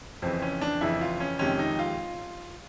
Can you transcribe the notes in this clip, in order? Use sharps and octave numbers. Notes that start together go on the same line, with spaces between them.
F2 C#3 E3 C4
C#4
D4
F2 C#3 E3 E4
F4
C#4
F2 C3 D#3 G#3 C#4
D#4
F4